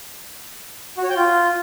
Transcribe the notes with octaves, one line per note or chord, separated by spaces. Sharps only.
F#4
C#5
G5
F4